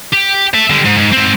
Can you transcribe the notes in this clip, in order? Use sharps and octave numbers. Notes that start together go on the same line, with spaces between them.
G4
E5 A5
D3 G3
G#2
G#2
G#2 C4